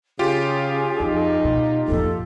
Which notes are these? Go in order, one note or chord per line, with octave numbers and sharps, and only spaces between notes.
C#3 F4 G4 G#4
F2 D#4
B2
F2 A#2 A4